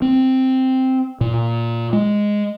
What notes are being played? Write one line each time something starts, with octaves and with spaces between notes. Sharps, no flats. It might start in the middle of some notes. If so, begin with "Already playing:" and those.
C4
A#2
G#3